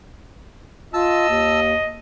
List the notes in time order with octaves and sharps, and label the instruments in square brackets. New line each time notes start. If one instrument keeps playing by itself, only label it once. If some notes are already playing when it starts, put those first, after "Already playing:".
[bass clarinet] F4 [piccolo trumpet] D#5 [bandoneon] A5 E6
[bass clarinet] D#2